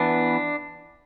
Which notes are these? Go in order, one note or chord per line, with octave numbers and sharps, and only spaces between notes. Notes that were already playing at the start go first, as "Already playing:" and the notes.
Already playing: E3 B3 D4